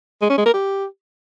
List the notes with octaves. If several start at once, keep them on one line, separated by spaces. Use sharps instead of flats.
G#3
C#4
G#3
A#4
G4